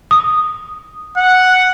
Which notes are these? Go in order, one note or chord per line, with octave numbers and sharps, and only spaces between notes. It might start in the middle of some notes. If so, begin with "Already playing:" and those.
D#6
F#5